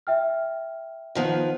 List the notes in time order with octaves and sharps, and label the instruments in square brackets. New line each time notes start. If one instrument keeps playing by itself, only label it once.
[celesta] E5 G5 F6
[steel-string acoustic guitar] D#3 F3 B3